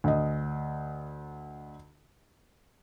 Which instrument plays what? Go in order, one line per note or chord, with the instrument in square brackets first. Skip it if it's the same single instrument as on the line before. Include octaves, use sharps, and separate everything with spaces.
[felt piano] D2 D#5